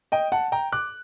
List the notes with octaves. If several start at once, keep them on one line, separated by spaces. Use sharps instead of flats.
D#5 G5
F#5 A5
G5 A#5
D6 F#6